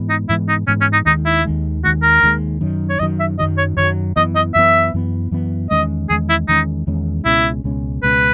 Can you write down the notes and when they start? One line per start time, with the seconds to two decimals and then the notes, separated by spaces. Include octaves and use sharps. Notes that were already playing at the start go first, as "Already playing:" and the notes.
Already playing: G#2 E3 G#3 B3
0.09 D#4
0.29 G#2 E3 G#3 B3 E4
0.49 D#4
0.67 G#2 E3 G#3 B3 C#4
0.81 C#4
0.93 D#4
1.06 D#2 D#3 G#3 D#4
1.25 E4
1.45 D#2 D#3 G#3
1.84 D#2 D#3 G#3 F#4
2.02 A#4
2.23 D#2 D#3 G#3
2.61 F#2 D#3 F#3
2.89 C#5
2.99 F#2 D#3 F#3 D#5
3.20 E5
3.39 F#2 D#3 F#3 D#5
3.58 C#5
3.77 F#2 D#3 F#3 C#5
4.16 F#2 E3 B3 D#5
4.36 D#5
4.54 F#2 E3 B3 E5
4.94 F#2 E3 B3
5.31 F#2 E3 B3
5.70 E2 D#3 G#3 C#4 D#5
6.10 E2 D#3 G#3 C#4 G#4
6.29 E4
6.48 E2 D#3 G#3 C#4 D#4
6.87 E2 D#3 G#3 C#4
7.25 C#2 B2 G#3 C#4 E4
7.64 C#2 B2 G#3 C#4
8.03 C#2 B2 G#3 C#4 B4